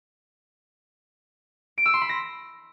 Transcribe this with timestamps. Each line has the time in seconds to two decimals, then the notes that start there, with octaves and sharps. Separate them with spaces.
1.78 D7
1.86 E6
1.93 C6
2.01 B5
2.09 A#6